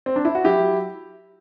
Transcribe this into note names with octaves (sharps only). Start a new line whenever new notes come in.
C4
D4
E4
F#4
F#3 E4 G4
F#3